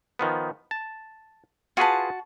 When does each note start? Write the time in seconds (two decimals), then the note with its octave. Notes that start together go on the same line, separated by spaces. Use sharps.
0.19 D#3 F3 B3
0.71 A5
1.77 F4 F#4 G#4 B4 A5